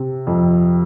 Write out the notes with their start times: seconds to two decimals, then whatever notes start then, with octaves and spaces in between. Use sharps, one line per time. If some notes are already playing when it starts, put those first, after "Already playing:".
Already playing: C3
0.27 F2